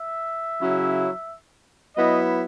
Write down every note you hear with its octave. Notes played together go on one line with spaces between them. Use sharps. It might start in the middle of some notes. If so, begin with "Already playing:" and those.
Already playing: E5
C#3 F#3 C#4 E4
F#3 B3 E4 D#5